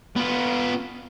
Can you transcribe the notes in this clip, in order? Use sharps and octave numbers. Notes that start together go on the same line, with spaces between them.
B3 F4